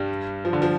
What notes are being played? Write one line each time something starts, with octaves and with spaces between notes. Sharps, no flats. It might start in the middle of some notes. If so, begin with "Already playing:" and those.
Already playing: G2 G3
F3
D3
F3